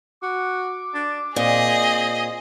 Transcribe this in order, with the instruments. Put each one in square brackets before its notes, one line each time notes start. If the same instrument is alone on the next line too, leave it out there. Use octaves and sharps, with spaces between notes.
[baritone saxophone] F#4 [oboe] D6
[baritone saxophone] D4
[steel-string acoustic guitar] A#2 [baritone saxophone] C4 [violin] G#4 D#5